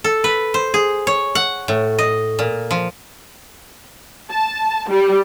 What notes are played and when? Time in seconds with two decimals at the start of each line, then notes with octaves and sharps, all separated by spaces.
0.04 A4
0.24 B4
0.54 C5
0.74 G#4
1.07 C#5
1.35 F#5
1.68 A2
1.99 D#5
2.39 A#2
2.71 F3
4.30 A5
4.88 G3